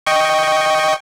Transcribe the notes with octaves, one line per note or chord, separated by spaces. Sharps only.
D#5 G5 C#6